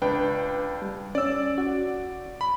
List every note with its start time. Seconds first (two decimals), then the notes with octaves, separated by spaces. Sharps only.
0.02 C#2 D4 B4 G5
0.82 G3
1.15 C#4 D5 E6
1.58 F#4
2.41 B5